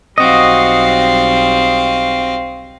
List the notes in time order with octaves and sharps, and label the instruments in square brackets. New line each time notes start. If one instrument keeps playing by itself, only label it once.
[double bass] B1 G3 [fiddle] C4 F5 [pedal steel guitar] F#4 D#5